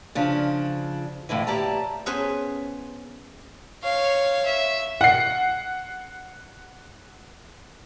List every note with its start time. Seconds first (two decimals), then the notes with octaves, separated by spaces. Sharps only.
0.15 C#3 F3 D4
1.29 F2 A2 D3 E3
1.47 A2 G4 D5 A5 A#5
2.06 B3 C#4 G#4 B4 C5
3.83 C#5 F5
4.46 E5
5.01 F#5 C7